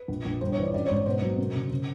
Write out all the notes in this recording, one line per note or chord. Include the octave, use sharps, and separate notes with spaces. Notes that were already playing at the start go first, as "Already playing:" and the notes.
Already playing: B4
A#1
A#1
G1 C5
C#5
E3
D5
A1 D5
C#5
G#2 C5
B2 C5
F#3
F#2
C#3
C#3